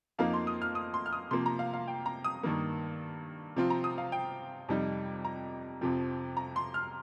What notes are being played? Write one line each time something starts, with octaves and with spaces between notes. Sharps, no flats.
F2 F3 A#3 D#4 F5
C6
D#6
F6
D#6
C6
F6
D#6
C3 F3 A#3 C6
A#5
F5
F5
G5
A#5
D#6
G2 D#3 A#3
C3 F3 C4 F4
A#5
D#6
F5
G5
F2 C3 G3 D#4
A#5
F2 C3 F3 C4
A#5
C6
F6